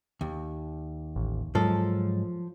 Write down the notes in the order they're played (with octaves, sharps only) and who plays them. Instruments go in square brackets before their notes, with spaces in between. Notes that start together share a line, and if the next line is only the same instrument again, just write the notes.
[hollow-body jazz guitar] D#2
[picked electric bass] A1
[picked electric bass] G#2 F#3 G#3 [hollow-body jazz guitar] F3 A4